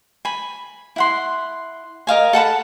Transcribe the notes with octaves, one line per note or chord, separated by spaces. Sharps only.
G#5 B5
E4 F#5 C6
A#4 D#5 F5 G#5
A4 F#5 A5 B5